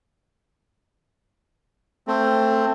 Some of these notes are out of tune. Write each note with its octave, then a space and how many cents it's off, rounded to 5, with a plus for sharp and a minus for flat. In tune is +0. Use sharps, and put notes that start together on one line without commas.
A3 +15 C4 +5